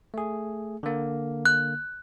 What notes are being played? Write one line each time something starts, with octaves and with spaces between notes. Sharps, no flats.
A3 G#4
D3 A#3
F#6